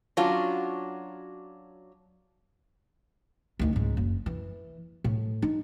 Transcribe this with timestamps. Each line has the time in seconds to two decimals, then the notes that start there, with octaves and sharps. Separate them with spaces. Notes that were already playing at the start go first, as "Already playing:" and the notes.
0.17 F#3 C#4 D4 F4 F#4
3.59 D2 D#3
3.73 C#2 G#2
3.97 F#1
4.26 E3
5.04 A2
5.42 D#4